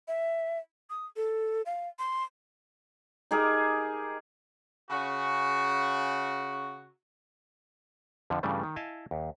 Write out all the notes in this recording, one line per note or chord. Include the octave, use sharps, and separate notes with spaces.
E5
D#6
A4
F5
C6
D#4 G4 G#4 A#4
C#3 F#4
F2 D3 F3
G2 C#3 E3 G3 A3
D#3
E4 D#5 F5 G#5 A5
D#2